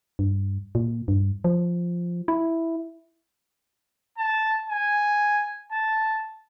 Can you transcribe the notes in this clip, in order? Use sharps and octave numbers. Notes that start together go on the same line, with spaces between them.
G2
A#2
G2
F3
E4
A5
G#5
A5